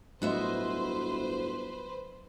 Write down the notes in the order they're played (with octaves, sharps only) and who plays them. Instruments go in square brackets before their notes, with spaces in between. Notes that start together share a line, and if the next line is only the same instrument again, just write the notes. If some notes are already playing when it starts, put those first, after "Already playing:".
[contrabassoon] G1 [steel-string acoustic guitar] A2 F#4 E5 [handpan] F#3 D#5 [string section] B4 C5